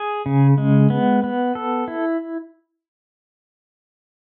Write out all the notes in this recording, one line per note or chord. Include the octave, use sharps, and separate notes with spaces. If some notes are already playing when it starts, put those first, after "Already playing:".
Already playing: G#4
C#3
G#3
B3
B3
A4
E4